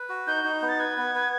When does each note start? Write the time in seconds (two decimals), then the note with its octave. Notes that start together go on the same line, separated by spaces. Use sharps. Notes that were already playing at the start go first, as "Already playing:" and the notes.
Already playing: B4
0.09 F#4
0.27 D#4 G6
0.44 D#4
0.62 B3
0.68 A6
0.79 B4 G#6
0.98 B3
1.15 B4